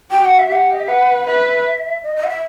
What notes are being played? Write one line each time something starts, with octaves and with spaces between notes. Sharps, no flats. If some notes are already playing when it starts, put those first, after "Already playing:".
F#4 G5
F#5
E5
G4 F#5
D#5
E5
B4 F#5
B4 E5
D#5
D#5
F#5
E5